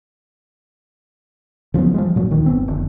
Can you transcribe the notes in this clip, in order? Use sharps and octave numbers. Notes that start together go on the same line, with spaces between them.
C#3 F3 F#3 B3
F3 G3 G#3
A#2 F#3
D2 D#3
G1 B3 C4
F1 D3